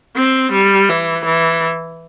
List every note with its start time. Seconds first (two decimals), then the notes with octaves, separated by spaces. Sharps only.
0.16 C4
0.52 G3
0.89 E3
1.25 E3